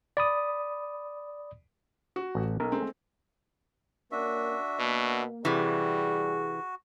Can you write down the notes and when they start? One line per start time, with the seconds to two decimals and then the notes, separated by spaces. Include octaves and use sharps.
0.17 D5 B5 D#6
2.16 F#4
2.35 A1
2.60 B1 A#4
2.72 G#3 A3 C4
4.12 A#3 C#4 D4 F#4 A#4 E5
4.79 B2 A#3
5.45 C3 E3 G3 F#4 G#4